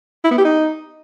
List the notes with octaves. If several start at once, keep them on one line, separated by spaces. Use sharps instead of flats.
E4
B3
G4
D#4